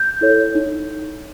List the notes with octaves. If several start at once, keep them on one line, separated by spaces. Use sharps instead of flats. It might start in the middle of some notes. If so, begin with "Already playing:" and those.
Already playing: G6
E4 A4 C#5
D#4